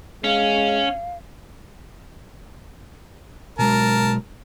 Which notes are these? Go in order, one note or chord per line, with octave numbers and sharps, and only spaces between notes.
G#3 C#4 F5
B2 F#3 G#3 A#4 A5